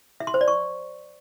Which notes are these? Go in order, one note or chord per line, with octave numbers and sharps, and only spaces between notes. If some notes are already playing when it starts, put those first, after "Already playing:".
E5
C6
C5
D5
C#6